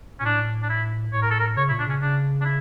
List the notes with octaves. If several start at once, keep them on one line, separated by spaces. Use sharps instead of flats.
A#2 C#4
A2 D4
D4
E4
A2 C#5
A#4
A4
A#4
C#3 C#5
E4
A#2
D4
C#3 C#4
C#3 D4
D4
E4